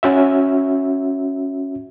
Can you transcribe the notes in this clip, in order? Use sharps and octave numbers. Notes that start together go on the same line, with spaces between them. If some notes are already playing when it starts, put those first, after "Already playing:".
C#4 F#4 E5